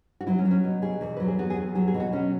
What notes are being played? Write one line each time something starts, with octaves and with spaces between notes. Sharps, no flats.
F#4
F#3 E4
C#4
F#3
C#4
B2
B2 G#4
E2
F#3 B4
G#4
B3 F#4
G#4
E2
F#3 G#4
G#4
B2
F#4
F#3 C#4